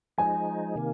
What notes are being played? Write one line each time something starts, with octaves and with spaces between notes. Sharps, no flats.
F3 G#3 D#4 G#5
C3 D#3 A#3